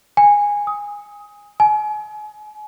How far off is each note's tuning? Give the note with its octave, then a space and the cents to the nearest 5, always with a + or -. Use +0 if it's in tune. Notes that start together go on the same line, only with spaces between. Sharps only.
G#5 -15
D#6 +20
G#5 +35